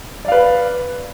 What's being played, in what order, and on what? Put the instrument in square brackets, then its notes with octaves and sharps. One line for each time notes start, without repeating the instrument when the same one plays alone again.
[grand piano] D5
F5
B4